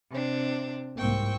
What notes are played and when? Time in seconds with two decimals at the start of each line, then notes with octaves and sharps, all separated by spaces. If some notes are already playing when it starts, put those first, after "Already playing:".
0.11 C3 C4 D4
0.98 C2 G#2 A#3 C4 G5 C#6